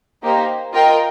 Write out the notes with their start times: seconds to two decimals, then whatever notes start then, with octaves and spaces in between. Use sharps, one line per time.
0.23 A#3 D#4 G4 C5 D#5
0.73 F4 A#4 D#5 G5